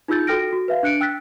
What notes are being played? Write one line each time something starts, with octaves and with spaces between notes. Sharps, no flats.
D#4 F4 G#4 E6 G6 A6
F#4 A4 G5 F6 A#6 D7
F#4
B4 E5 F5
D4 F#6 C#7 D7
G5 E6 F#6 A6 B6